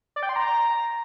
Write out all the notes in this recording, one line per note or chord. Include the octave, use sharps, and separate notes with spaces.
D5
G5
C6
A#5